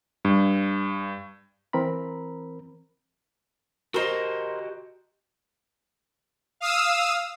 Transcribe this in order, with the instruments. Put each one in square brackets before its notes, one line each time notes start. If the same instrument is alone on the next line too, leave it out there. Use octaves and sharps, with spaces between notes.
[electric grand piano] G2
[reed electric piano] E3 C4 A#4 A#5 B5
[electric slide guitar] F#4 G4 D#5 [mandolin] A#4 C5
[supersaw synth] F5 D#6 E6